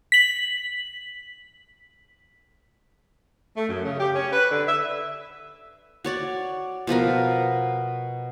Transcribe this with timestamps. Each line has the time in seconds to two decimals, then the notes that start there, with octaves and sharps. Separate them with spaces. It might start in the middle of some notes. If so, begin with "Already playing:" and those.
0.12 B6 F#7
3.57 A3
3.69 F#2
3.85 C#3
4.00 G4
4.15 C#4
4.32 B4
4.51 D3
4.67 E5
6.04 F#4 C#5 D5
6.87 B2 F3 B3 A#4